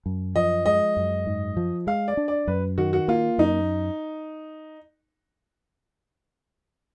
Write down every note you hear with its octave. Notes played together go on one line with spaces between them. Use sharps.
F#2
F3 D#5
G#3 D#5
F#2
G#2
F3
G#3 F5
D5
D4
D5
F#2 B4
D#3 F#4
F#4
A#3 F4
F#2 D#4